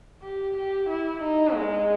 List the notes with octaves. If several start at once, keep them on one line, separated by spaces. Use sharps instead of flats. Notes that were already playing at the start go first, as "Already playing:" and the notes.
G4
G4
E4
D#4
G#3